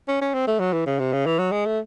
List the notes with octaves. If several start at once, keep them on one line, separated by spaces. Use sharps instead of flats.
C#4
C#4
C4
A3
F#3
E3
C#3
C3
C#3
E3
F#3
G#3
A3